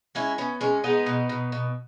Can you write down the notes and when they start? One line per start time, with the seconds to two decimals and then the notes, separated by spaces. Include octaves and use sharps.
0.15 G#3 C#4 E4
0.38 B3 C#4
0.61 G#3 C#4
0.84 G#3 B3 D#4
1.06 B2
1.29 B2
1.52 B2